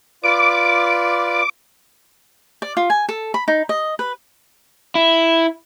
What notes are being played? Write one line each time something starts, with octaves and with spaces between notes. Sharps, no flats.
F4 B4 D5 D6
D5
F4
G#5
A4
B5
D#4
D#5
B4
E4